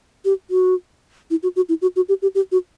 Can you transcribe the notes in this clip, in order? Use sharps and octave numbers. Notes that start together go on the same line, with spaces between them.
G4
F#4
E4
F#4
F#4
E4
F#4
F#4
G4
G4
G4
F#4